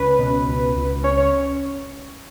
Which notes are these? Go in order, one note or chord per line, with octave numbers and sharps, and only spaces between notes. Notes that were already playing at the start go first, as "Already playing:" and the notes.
Already playing: C#2 C#4 B4
B2
C#2
C#2
C#4 C#5
C#5